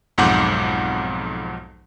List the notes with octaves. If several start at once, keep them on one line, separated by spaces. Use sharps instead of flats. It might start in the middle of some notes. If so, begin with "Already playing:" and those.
B1 F2 G#2 F#5 D6 G6